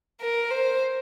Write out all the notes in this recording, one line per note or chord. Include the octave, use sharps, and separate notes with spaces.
A#4
C5